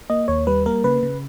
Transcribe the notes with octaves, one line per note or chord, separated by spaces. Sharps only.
A#3 D#5
D#2 C#5
G3 B4
A#3 A#4
C#3 B4
C#3